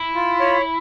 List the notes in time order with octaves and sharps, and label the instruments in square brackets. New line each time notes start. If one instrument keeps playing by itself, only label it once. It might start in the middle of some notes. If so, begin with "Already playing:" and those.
Already playing: [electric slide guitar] E4
[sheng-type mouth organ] F4
C#5